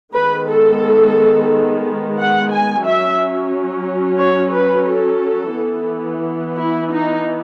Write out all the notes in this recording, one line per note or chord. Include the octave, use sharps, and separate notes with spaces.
D#3 G#3 B3 B4
A4
F#5
G#5
F#3 C#4 E5
C#5
B4
A4
E3 B3
E4
D#4